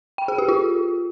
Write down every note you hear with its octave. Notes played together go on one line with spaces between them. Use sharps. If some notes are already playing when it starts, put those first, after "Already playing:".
G5
G#4
G4
F4